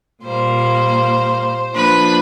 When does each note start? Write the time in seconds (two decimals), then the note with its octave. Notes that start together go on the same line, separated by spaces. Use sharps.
0.23 A#2 G3 A#3 C5
1.74 F3 A#3 D4 B4